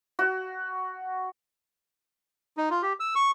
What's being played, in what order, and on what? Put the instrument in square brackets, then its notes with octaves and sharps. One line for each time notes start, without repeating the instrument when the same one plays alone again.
[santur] F#4
[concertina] D#4
F4
G4
E6
C#6